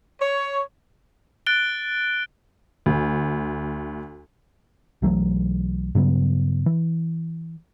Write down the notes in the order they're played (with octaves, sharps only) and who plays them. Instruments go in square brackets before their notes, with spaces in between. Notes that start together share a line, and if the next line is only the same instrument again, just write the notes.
[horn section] C#5
[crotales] F#6 A6 D7 G7
[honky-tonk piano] D2
[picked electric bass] B1 E3 F#3 A3
G2 C#3 F#3 B3
E3